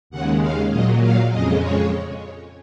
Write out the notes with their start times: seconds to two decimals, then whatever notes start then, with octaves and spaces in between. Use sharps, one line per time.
0.10 D#2 C#3 G#3 F#5
0.41 F5
0.70 A#2 F#3 D#5
1.02 F5
1.31 F2 C#3 G#3 D#5
1.61 C#5